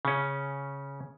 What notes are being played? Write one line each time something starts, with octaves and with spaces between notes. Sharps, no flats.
C#3 C#4